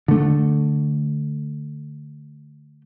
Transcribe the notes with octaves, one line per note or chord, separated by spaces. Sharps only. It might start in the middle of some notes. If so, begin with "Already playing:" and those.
D3 A3